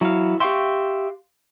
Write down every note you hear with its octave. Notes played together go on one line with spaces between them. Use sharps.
E3 F#3 E4 F#4 F5
G4 E5 F5 G5 C6 C#6